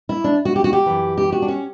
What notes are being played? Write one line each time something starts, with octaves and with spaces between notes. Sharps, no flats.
E4
D4
F#4
G4
F#4
G4
F#2 E3
G4
F#4
D4
C#4